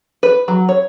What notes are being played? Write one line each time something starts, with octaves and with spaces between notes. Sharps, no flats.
B4
F#3
C#5